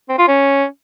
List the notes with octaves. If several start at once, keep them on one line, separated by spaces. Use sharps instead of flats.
C4
F4
C#4